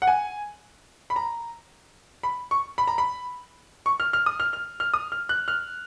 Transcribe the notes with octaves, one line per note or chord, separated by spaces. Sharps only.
F#5
G#5
B5
A#5
B5
C#6
B5
A#5
B5
C#6
F6
F6
D#6
F6
F6
F6
D#6
F6
F#6
F6